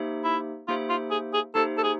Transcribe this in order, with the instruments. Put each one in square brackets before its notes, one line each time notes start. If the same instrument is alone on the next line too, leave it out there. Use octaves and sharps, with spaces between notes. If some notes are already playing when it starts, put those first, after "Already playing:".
Already playing: [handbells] A#3 D#4 G4 C5 E5
[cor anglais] E4
[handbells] A#3 D#4 G4 C5 E5 [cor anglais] F4
[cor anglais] F4
G#4
G#4
[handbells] A#3 D#4 G4 C5 E5 [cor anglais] A4
[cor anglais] A4
G#4